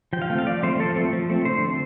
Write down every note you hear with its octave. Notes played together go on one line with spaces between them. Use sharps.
F3 G5
F5
A3 C4 G5
F5
F3 D5
A3 C4 C5
F3 A4
A3 C4
F3
A3 C4
D3 C5
A3 C4